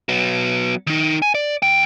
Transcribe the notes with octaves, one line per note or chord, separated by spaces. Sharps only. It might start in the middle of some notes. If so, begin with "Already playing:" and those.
F#3 B3
D#3 D#4
G#5
D5
D2 G5